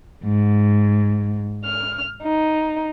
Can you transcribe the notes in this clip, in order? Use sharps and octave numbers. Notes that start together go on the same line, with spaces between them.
G#2
F6
D#4